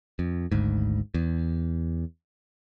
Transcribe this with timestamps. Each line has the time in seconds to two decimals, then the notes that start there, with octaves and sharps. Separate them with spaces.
0.19 F2
0.52 G#1 D2 G#2
1.14 E2